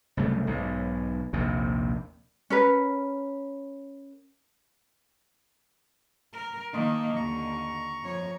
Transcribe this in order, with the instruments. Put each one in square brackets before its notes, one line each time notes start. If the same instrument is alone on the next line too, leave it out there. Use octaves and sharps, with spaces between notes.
[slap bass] C2 F#2 C#3 A3
B1 G#2
A#1 D#2 C3
[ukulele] C#4 A#4 B4
[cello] A#4
[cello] D#3 A#3 [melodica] D#5 A5
[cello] D#2 D3 [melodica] A#5 C#6
[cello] F2 C#5